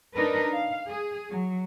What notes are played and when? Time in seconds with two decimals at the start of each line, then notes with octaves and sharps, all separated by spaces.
0.15 D4 D#4 A#4 B4
0.52 F5
0.87 G#4
1.29 F#3